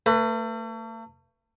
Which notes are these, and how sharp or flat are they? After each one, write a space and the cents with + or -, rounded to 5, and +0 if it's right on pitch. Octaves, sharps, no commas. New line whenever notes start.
A3 +40 B4 +0